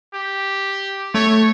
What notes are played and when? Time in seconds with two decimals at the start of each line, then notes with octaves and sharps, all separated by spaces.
0.14 G4
1.14 A3 C#5